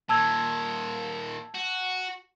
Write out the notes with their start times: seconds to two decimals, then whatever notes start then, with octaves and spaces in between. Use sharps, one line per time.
0.09 A#2 D#3 A5 E6 G#6
1.54 F#4